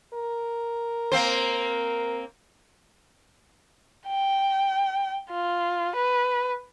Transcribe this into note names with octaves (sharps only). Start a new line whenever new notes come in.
A#4
A#3 C4 C5
G5
F4
B4